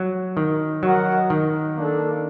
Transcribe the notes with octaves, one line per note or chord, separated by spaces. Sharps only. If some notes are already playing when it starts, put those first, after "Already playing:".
Already playing: F#3
D#3
F#3 F#4 A#4 D#5 F#5
D#3
A#3 D4 A4